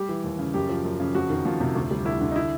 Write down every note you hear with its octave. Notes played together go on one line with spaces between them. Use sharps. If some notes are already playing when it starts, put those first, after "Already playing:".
Already playing: G3 G4
E3
D#2
C#3
F#2 G4
F3
F#2
C#3
F2 F#4
D#3
F2 F4
C3
D2
G3
D2 E4
D3
D#4
E4